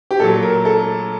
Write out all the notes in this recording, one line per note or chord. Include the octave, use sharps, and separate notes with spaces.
G4
A#2 F#3 A4
A#4
A4